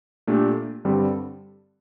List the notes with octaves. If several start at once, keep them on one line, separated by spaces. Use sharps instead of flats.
A#2 A3 D4 G4
G2 D3 G3 C4